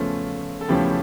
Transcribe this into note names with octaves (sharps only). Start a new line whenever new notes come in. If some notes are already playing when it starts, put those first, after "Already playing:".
Already playing: E2 C#3 F3 A3 C#4 F4
A4
E2 C#3 F3 A3 C#4 E4 G4